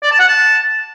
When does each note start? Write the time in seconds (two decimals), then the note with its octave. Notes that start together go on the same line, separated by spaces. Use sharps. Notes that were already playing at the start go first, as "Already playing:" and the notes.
0.03 D5
0.11 A5
0.19 F#5
0.27 A5